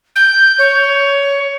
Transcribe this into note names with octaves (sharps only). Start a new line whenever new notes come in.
G6
C#5